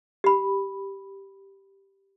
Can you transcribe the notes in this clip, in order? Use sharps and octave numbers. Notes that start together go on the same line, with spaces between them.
G4 B5